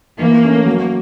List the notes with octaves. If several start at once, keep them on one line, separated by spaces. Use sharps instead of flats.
E3 A#3
A3 C#4
F#3